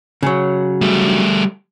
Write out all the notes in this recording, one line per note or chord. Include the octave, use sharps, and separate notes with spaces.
C#3 F#3
G3 A3